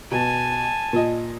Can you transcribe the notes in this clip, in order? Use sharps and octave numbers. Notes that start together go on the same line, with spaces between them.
B2 G#5 A5
A#2 D#5